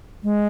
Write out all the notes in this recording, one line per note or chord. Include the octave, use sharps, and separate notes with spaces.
G#3